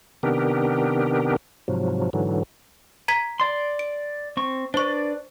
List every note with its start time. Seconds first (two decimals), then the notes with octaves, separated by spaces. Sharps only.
0.23 C3 D#3 B3 D4 G4 A#4
1.68 G#2 C3 F3 F#3
2.13 G#2 D3 E3 F#3
3.08 A#5 G#6 B6
3.40 D5 C6
3.79 D7
4.37 C4 C#6
4.74 D4 B4 C5 D5 C#6